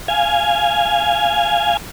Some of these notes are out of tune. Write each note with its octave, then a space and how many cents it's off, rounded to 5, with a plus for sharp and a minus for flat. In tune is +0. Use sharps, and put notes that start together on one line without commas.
F5 -5 G#5 +0